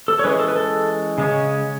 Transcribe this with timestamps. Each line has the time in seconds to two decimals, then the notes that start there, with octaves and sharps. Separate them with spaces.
0.08 A4
0.19 C#5
0.24 E3 G#3 C#4 B4
0.39 A4
0.48 B4
0.56 A4
1.18 C#3 G#3 C#4